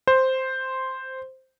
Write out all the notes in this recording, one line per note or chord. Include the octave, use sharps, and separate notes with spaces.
C5